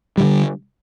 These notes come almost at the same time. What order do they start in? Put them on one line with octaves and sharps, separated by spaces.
G3 D#3 D3